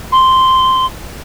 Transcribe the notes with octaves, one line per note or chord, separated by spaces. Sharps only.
C6